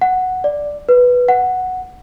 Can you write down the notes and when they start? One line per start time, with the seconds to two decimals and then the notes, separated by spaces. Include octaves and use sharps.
0.01 F#5
0.44 D5
0.89 B4
1.28 F#5